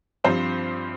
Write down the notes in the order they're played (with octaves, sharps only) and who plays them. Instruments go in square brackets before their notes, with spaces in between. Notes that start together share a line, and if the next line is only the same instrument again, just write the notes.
[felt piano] G2 F3 C4 G4 C5